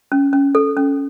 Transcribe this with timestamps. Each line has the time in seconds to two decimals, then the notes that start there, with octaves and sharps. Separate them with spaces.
0.12 C#4
0.33 C#4
0.55 A4
0.77 C#4